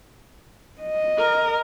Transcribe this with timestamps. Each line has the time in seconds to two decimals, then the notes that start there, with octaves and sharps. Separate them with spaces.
0.82 D#5
1.19 A#4